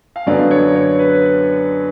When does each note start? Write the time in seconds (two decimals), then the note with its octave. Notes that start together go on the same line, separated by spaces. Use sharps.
0.16 F5
0.26 F#2 D3 F#3 B3 D5
0.51 C#5
0.75 C#5
0.99 B4